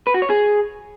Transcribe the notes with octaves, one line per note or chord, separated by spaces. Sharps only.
B4
F#4
C#5
G#4